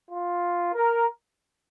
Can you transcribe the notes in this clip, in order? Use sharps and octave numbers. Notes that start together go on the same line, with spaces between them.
F4
A#4